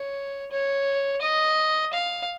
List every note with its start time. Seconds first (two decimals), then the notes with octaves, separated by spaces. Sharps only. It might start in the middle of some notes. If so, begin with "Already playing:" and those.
Already playing: C#5
0.51 C#5
1.21 D#5
1.93 F5